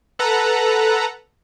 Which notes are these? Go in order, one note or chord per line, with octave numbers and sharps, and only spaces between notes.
A4 B4 F#5 A#5